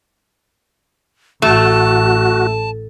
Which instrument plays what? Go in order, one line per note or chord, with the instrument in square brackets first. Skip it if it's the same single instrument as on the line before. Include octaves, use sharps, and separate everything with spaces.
[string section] A1 [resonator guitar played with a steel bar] A3 [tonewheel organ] F#4 [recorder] A5